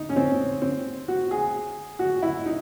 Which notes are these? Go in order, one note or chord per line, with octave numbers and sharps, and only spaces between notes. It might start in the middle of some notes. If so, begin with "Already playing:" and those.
Already playing: D#4
C#4
C4
C4
F#4
G#4
F#4
E4
D#4